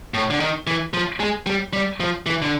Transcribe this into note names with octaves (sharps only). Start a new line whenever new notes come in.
A2
D3
D#3
E3
F3
G#3
G3
G3
F3
E3
D3